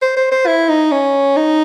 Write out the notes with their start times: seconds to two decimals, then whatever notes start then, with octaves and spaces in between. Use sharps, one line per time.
0.02 C5
0.17 C5
0.32 C5
0.47 E4
0.69 D#4
0.92 C#4
1.37 D#4